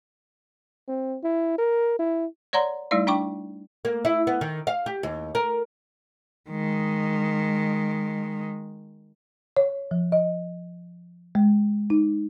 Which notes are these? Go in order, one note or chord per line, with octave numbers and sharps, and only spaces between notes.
C4
E4
A#4
E4
C#5 D5 F#5 A#5 C6
G3 A3 D#4 E4 D5
D4 G5 C#6 D6
A#3
E4
B3
D#3
F5
G4
D#2
A#4
D#3 G#3
C#5
F3
D#5
G#3
D#4